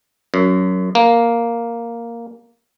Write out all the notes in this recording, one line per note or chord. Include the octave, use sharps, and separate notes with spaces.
F#2
A#3